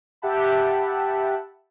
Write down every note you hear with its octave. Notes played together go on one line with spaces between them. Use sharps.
G4 E5 F#5 G5 A5 B5